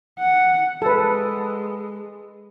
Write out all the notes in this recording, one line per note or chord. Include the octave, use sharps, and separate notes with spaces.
F#5
G#3 A4 B4